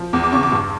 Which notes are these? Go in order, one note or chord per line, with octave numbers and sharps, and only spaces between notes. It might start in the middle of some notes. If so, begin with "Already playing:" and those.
Already playing: F3
E2 D6
D6
C#3 C#6
D6
G2